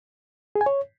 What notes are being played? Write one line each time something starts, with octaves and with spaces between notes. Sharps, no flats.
G#4
G#5
C#5